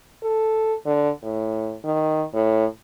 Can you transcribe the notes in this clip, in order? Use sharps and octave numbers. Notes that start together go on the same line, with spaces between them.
A4
D3
A2
D#3
A2